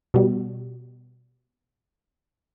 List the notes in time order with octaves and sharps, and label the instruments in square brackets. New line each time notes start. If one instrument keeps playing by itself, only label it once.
[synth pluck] B2 G3